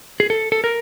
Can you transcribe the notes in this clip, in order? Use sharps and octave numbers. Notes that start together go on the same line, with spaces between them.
G#4
A4
A4
A#4